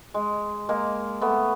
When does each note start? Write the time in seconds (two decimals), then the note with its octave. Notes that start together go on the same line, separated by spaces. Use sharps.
0.14 G#3
0.69 G#3 A#3
1.21 A3 B3